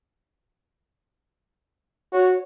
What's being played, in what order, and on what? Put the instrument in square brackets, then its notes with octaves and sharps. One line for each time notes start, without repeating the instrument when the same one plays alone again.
[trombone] F#4 [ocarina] C#5